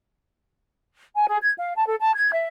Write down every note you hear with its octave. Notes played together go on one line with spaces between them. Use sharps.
G#5
G#4
G#6
F5
A5
A4
A5
G#6
E5